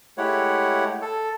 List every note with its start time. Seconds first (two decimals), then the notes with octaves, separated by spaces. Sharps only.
0.18 G#3 A3 E4 G4 C#5 F#5
1.02 A4